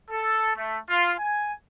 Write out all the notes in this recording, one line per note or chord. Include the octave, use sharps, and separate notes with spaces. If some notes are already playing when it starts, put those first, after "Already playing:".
A4
A3
F4
G#5